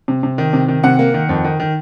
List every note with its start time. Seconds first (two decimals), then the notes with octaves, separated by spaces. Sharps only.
0.08 C3
0.23 C3
0.38 D#3
0.53 C3
0.68 D#3
0.83 C3 F#5
0.99 A#3
1.14 D#3
1.29 F2
1.44 D#3
1.60 D#3